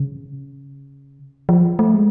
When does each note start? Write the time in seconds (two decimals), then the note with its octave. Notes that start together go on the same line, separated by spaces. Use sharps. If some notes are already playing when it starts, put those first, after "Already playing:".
Already playing: C#3
1.49 F3
1.79 A3
1.94 G#3